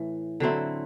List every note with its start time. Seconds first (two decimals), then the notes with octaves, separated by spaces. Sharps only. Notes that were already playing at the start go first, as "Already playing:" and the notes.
Already playing: A2 E3
0.40 D3 F#3 C4 E4